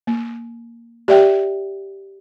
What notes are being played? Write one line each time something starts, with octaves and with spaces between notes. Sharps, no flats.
A#3
G4 D5 E5 G5